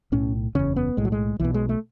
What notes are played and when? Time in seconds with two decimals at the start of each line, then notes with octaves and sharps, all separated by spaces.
0.12 B1 A2 C#4
0.55 F#1 E2 C#3 C#4
0.76 B3
0.97 B1 A2 G#3
1.05 F#3
1.12 G#3
1.40 B1 B2 E3
1.54 G#3
1.69 A3